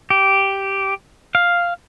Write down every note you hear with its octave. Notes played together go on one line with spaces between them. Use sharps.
G4
F5